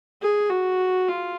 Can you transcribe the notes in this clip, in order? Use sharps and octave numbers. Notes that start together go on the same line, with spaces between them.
G#4
F#4
F4